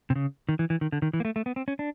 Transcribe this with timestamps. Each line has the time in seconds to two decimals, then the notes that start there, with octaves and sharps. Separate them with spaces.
0.10 C3
0.16 C#3
0.49 D#3
0.59 E3
0.70 E3
0.81 D#3
0.92 D3
1.02 D#3
1.13 E3
1.20 A#3
1.25 A3
1.36 A3
1.46 B3
1.56 C4
1.68 C#4
1.79 D4